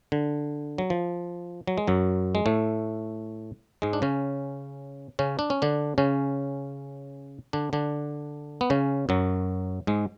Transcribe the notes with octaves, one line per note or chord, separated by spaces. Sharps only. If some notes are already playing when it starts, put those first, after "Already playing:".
D3
F#3
F3
F#3
G#3
F#2 F#3
G#3
A2 A3
G#2 G#3
D4
C#3 C#4
C#3 C#4
D4
C#4
D3 D4
C#3 C#4
D3 D4
D3 D4
B3
C#3 C#4
F#2 F#3
G#2 G#3